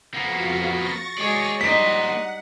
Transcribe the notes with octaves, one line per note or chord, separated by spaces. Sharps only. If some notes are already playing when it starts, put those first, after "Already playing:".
F2 A#3 B3 F#4 F5
C#6 A6 A#6
G#3 F#4 G#4 C#5 D5
G3 A#3 D#4 C5 F#5 B6